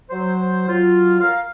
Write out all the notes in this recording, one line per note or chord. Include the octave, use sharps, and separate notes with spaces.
F#3 C5
F#3 F4
A#4 F5